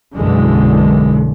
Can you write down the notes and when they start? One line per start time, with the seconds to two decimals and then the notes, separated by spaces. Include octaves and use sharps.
0.15 B1 F#2 D3 E3 G#3